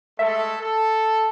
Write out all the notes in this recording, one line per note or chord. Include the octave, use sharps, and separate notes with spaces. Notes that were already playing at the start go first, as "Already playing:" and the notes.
G#3 A3 A4 E5
A4